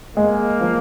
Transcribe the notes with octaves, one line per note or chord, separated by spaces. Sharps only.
G#3 A#3
F3